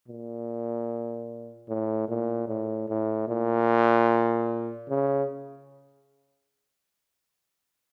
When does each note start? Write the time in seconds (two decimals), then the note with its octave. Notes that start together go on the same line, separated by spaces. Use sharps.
0.08 A#2
1.68 A2
2.08 A#2
2.48 A2
2.89 A2
3.28 A#2
4.89 C#3